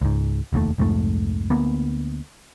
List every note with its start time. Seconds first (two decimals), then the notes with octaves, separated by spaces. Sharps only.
0.01 C#2 G#2
0.53 F1 D#2 A#2 A3
0.78 C2 F2 G#2 A3
1.50 D2 A#3 B3